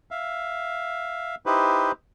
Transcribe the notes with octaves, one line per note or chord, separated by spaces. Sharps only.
E5 F5
D#4 E4 G4 B4 C5